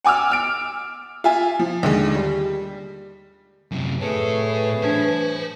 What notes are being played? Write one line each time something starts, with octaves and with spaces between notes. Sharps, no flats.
F#5 G#5 D6 E6 F6
E6 F6 D7
F4 E5 G#5
F3
D#2 D3 G#3
G3
F#2 C3
A2 A3 G#4 A4 B4 C#5
D4 C5 A5 G#6 B6